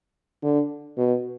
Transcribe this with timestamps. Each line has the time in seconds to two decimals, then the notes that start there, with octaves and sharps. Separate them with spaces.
0.43 D3
0.97 B2